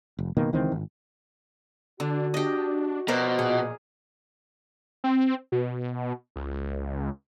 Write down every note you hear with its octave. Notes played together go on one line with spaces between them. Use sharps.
F1
F#1 B2 D#3 A#3
C#2 D#3 E3 C4
G#1
D3 D4 F#4
D4 G4 D#5
B2 F3 A#4 C5 D5 D#5
A#2 G#4
C4
B2
C#2